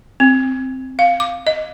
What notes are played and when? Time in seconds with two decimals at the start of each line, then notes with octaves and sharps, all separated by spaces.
0.20 C4
0.99 F5
1.20 D6
1.47 D#5